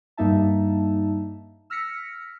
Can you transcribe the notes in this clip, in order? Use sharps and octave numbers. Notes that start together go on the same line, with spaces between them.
G2 G3 A#3 D#4 E5 A5
E6 F6 A#6 B6 C#7